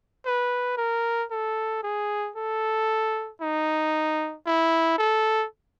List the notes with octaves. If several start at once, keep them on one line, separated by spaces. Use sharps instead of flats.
B4
A#4
A4
G#4
A4
D#4
E4
A4